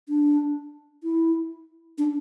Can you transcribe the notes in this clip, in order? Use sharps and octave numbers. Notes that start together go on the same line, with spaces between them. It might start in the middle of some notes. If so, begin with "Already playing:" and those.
D4
E4
D4